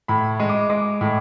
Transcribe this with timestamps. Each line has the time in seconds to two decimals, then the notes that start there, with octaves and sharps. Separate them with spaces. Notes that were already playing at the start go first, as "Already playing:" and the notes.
0.08 A2 B5
0.40 G#3
0.50 D6
0.70 G#3 D6
1.01 A2